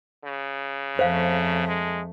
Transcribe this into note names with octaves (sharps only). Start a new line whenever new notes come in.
C#3
F2 A3 C5 F5
G#3